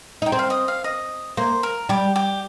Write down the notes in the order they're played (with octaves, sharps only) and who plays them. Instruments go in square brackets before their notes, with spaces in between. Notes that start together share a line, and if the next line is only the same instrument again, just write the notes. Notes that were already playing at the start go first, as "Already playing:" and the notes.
[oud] D#4 [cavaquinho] G5
[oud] C4
[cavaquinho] F5
D#5
F5
D#5
[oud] A#3 [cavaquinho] C5
[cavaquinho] A#4
[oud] G3 [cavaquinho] G4
[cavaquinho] G4